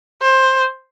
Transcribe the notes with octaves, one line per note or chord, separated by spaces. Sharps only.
C5